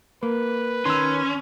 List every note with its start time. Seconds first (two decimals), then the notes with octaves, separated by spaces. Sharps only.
0.23 A#3 B4
0.86 D#3 C#4 C6 E6